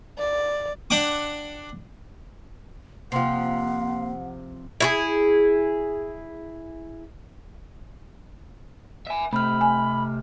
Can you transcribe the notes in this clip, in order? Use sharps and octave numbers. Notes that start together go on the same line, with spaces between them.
D5
D4 F#5 G5 D6
C3 F3 A#3 F5 F#5 C6 C7
E4 F4 G#4
E5 G#5
C3 A3 B5 F6
G#5